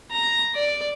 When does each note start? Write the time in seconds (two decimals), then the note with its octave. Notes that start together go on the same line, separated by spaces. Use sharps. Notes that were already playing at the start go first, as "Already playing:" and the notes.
0.11 A#5
0.54 D5